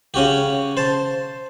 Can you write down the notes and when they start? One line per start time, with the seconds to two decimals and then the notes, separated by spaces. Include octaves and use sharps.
0.14 C#3 C#4 F#4 G4
0.77 C5 A5